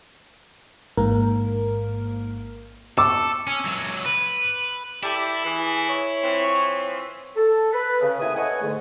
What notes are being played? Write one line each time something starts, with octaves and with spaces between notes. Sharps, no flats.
A1 G#2 A#3 A#4
A4 D6 E6
C#4
C#2 F#3
B4
E4 G4 A4 D5 E5
E3 G#4
C#5
E3 F3 C4
A4
B4
C#3
D#2 A2 C3 E4 G#5 D#6
A4 B4 C#5 D#5 F#5 G#5
E2 G#2 D3 A3